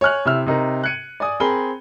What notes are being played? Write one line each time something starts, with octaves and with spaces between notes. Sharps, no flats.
C#5 G#5 F6 F#6
C3 E4 E6 F6
C3 D#4 A#4
F#6 G#6 C#7 D#7
D5 G#5 D#6
C4 G#4 A#4 B5 G7